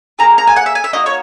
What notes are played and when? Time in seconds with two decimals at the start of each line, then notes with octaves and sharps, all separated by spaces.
0.19 A#3 E4 G#4 A#5
0.38 A#5
0.47 G#5
0.56 F#5
0.66 E5
0.75 G#5
0.84 E5
0.93 A#3 D#4 F#4 D#5
1.06 C#5